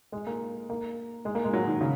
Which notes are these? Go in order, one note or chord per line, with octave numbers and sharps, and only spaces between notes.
G#3
A#3
A#3
G#3
A#3
G#3
F#3
D#3
C#3